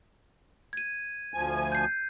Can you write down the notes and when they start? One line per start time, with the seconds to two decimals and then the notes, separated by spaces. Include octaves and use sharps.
0.73 G#6 D#7
1.34 D2 F3 G#5
1.72 G6 C7